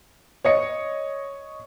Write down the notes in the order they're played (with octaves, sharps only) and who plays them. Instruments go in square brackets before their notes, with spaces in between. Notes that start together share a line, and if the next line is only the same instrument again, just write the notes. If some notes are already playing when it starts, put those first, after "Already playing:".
[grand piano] C#5 D#5 C#7